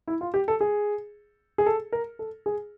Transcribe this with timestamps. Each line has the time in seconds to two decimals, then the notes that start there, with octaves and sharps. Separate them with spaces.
0.08 E4
0.21 F4
0.34 G4
0.48 A4
0.61 G#4
1.58 G#4
1.66 A4
1.92 A#4
2.19 A4
2.46 G#4